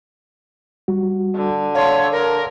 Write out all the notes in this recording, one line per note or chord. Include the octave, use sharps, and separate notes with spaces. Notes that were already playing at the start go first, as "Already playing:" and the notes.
G3 F#4
D3
C#5 F5 A5 C6
A#4